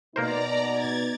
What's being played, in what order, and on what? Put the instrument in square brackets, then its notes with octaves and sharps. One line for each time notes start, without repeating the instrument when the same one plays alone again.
[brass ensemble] B2 [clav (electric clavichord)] A#3 A#4 C5 [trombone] D#4 [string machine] D5 A#5
[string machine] G#6 A6